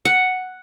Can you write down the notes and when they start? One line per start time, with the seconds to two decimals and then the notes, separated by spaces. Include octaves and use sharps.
0.05 F#5